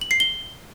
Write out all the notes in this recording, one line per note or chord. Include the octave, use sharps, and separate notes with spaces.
F#7
C7
G7